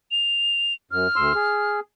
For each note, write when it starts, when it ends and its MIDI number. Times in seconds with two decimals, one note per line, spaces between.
0.11 0.74 101
0.91 1.07 42
0.91 1.78 89
1.16 1.33 38
1.16 1.33 84
1.16 1.33 88
1.35 1.80 68